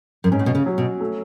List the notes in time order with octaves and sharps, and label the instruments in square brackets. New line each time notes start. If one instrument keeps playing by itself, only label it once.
[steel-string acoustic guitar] F#2
[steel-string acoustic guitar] G#2 [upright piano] C#4
[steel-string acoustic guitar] A2
B2
C#3
[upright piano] F#3
[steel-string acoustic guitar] B2
[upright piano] A3